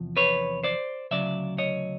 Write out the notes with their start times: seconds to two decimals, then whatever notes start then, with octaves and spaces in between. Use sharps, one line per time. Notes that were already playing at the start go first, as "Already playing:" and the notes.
Already playing: E2 C3 F3
0.17 B4 C#5
0.63 C5 D5
1.11 D2 C#3 F#3 D5 E5
1.58 C#5 D#5